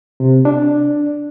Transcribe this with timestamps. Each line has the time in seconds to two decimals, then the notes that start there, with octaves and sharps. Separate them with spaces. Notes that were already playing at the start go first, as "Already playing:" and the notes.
0.20 C3
0.45 D4